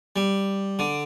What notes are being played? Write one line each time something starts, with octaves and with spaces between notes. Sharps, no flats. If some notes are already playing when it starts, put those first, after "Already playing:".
G3
D3